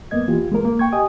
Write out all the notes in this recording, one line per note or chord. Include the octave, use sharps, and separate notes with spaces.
F#2 A#3 B3 D#5 G#6
E3 F4 G4
G#3 A#3 A#4
A#3
G5 C#6 G#6
G4 D#5 G#5 D#6